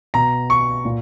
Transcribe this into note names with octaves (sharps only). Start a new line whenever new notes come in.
B2 A#5
C#6
A#2